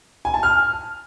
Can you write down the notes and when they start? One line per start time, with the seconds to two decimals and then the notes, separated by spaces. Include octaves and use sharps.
0.25 G#5
0.34 A5
0.43 F6